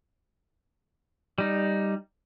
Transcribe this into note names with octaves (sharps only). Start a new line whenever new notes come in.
G3 D#4